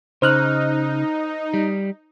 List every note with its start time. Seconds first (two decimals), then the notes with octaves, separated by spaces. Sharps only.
0.22 C#3 D#4 C5 F6 F#6
1.54 G3